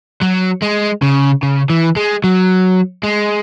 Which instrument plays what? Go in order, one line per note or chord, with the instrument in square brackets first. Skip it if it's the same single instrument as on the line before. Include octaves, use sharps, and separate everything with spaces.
[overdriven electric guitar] F#3
G#3
C#3
C#3
E3
G#3
F#3
G#3